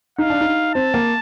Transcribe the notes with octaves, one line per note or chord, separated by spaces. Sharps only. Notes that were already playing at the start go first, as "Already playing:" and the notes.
D#4 F5
D4
D#4
C4 A5
A#3